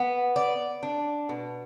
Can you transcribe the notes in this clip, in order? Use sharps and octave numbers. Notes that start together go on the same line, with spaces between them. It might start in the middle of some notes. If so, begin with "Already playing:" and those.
Already playing: B3
D5
D4
B2